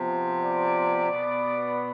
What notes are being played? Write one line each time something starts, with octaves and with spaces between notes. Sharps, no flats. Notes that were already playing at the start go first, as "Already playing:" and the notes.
Already playing: C3 F3 B3
D5
B2 B3